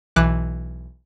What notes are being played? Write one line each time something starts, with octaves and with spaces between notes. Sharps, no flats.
B1 E3 D6 F#6